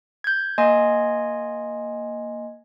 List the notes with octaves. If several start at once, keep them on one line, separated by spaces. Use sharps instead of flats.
G6 G#6
A#3 D#5 G#5 C6 G#6